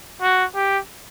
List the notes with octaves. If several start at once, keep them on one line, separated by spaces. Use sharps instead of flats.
F#4
G4